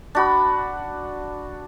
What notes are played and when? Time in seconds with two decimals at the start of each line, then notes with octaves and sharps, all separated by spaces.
0.15 D4 F#4 B5